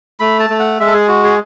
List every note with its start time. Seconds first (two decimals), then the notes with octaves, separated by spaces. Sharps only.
0.20 A3 B5
0.40 A5
0.50 A3
0.59 F#5
0.79 G#3 E5
0.87 A4
0.94 G#4
1.08 F#4
1.24 G#4